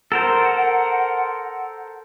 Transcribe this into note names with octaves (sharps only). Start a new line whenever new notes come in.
A4 A#4 C5 F#5